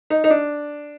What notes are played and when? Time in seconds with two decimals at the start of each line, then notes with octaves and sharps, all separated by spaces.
0.10 D#4
0.24 D#4
0.30 D4